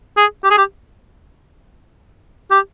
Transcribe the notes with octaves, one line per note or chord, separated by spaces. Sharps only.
G#4
G4
G#4
G4
G4